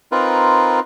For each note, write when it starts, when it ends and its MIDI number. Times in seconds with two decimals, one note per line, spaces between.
0.12 0.80 60
0.12 0.80 63
0.12 0.80 65
0.12 0.80 70
0.12 0.80 71